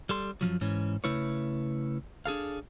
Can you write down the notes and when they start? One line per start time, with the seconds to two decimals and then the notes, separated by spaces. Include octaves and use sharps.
0.09 G3 A4 C6
0.41 F#2 B2 F3 F#3
0.61 G#2 E3 C#4
1.04 C#3 A3 E4 B4 C#5
2.26 D4 G#4 A4 F5